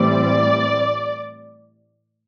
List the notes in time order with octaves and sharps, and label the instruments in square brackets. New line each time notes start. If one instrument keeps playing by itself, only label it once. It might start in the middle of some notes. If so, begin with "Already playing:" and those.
Already playing: [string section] A2 E3 G3 C4 D5